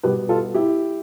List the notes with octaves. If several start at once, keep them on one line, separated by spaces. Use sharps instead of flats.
B2 G3 B3 G4 B4
F4 A4
E4 G4